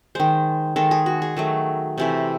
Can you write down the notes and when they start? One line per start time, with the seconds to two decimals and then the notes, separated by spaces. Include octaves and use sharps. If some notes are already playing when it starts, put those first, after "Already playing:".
0.15 D#3 G#3 C5
0.76 D#3 G#3 A4
0.91 G#4
1.06 F#4
1.22 G#4
1.37 D#3 F#3 A3
1.98 C3 E3 A3